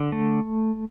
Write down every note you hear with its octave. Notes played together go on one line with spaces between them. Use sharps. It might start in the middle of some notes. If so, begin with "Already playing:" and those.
Already playing: D3
A3